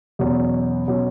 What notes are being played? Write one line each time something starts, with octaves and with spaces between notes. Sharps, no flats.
E2 B2 F#3 C#4
B2 F#3 C#4